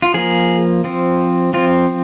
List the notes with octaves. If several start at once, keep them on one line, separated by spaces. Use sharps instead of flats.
F4
F3 A#3 G#4
F3 C4
F3 C4 F4